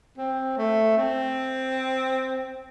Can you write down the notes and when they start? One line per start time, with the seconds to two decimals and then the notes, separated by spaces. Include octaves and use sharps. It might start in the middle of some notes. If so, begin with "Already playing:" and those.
0.18 C4
0.57 A3
0.97 C4